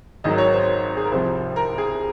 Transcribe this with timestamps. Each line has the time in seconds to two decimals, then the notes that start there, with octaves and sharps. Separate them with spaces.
0.24 G#1 G#2 D#3 F#3 D#5
0.38 C#5
0.53 C5
0.97 G#4
1.04 A#4
1.12 C2 C3 F3 C5
1.56 A#4
1.78 G#4